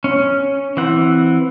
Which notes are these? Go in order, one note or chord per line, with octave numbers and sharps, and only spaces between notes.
C#4
E3 C4 F#5